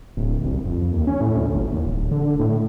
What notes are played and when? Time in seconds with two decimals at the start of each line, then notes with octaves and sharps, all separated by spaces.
0.17 D1
0.45 C2
0.66 F2
0.91 D#2
1.07 C#4
1.21 A2
1.37 D2
1.55 G1
1.72 D#2
1.85 D1
2.11 D3
2.39 A2